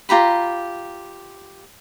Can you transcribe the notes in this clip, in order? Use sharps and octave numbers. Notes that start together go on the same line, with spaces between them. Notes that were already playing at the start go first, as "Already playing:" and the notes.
F4 G4 A#5 B5